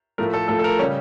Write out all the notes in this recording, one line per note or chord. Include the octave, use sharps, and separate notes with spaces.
A2 F3 A3 A#4
A4
A2 F3 A3 A4
A4
A#4
C#3 G3 C#4